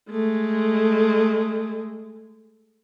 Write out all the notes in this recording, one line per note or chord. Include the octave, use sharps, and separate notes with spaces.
G#3 A3